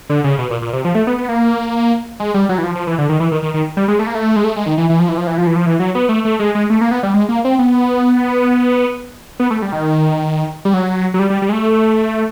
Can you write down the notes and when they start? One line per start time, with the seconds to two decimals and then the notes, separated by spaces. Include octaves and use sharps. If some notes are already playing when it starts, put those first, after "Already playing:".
0.10 D3
0.24 C#3
0.39 B2
0.50 A#2
0.62 A#2
0.73 C3
0.85 F3
0.95 A3
1.07 B3
1.18 B3
1.29 A#3
2.20 G#3
2.34 G3
2.49 F#3
2.58 E3
2.64 F3
2.75 F3
2.87 E3
2.98 D3
3.09 D#3
3.20 E3
3.32 D#3
3.43 D#3
3.54 D#3
3.77 G3
3.88 G#3
3.99 A3
4.07 A#3
4.15 A3
4.36 G#3
4.44 A3
4.56 G#3
4.66 D#3
4.78 E3
4.89 E3
4.99 F3
5.09 E3
5.18 F3
5.27 E3
5.38 F3
5.47 E3
5.56 F3
5.66 E3
5.79 F#3
5.95 B3
6.09 A3
6.25 A3
6.40 G#3
6.55 G#3
6.70 A3
6.81 A#3
6.91 B3
7.03 G3
7.14 G#3
7.29 A#3
7.45 C4
7.59 B3
9.40 B3
9.51 A3
9.62 G3
9.72 D#3
10.65 G3
10.74 F#3
11.14 F#3
11.19 G3
11.30 G3
11.42 G3
11.49 G#3
11.52 A3